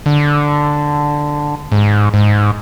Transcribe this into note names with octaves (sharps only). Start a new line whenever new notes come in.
D3
G#2
G#2